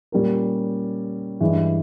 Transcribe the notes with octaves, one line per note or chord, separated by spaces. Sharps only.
A#2 G3 C#4 G4 A#4
G2 E3 G#3